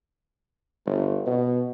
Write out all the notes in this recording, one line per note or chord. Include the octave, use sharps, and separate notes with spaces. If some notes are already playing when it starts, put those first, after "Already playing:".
G1
B2